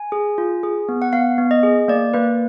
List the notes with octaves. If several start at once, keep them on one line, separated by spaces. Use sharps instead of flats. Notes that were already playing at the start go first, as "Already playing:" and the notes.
Already playing: G#5
G#4
F4
G#4
B3
F#5
B3 F5
B3
D#5
G#4
A#3 D5
A#3 B4